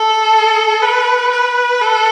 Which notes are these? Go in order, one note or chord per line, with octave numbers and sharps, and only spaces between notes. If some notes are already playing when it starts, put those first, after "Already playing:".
Already playing: A4
B4
B4
A4